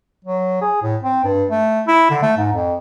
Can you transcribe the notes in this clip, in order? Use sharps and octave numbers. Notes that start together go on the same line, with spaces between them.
F#3
G#4
A2
C4
G2
A3
E4
D3
A3
G#2
F2